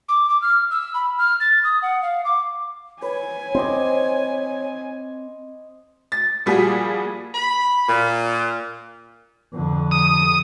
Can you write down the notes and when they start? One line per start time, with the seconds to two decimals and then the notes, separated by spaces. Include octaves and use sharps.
0.09 D6
0.29 D6
0.42 F6
0.71 E6
0.94 B5
1.18 F6
1.40 A6
1.64 D#6
1.82 F#5
2.02 F5
2.25 D6
3.02 B4 C#5 G#5
3.55 C4 C5 D#5 D6
6.12 A6
6.46 A#2 F3 G3 F#4 G#4
7.35 B5
7.89 A#2
9.53 F2 D3
9.91 D#6